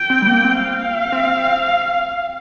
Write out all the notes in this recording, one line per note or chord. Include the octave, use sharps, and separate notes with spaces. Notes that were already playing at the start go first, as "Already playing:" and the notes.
Already playing: G5
C4
G3
A#3
C4
F5
C4